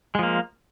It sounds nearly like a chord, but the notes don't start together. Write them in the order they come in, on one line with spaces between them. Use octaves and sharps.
G#3 F3 A#3